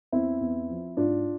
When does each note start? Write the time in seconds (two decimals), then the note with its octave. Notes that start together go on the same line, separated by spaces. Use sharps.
0.12 E2 C4 E4
0.41 E2
0.70 F3
0.97 G#2 D4 F4